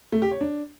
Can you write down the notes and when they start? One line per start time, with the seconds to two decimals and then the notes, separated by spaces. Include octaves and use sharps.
0.12 A3
0.22 G4
0.31 C#5
0.41 D4